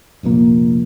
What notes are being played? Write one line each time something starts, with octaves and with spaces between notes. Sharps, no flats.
F1 A#1 A#2 A#3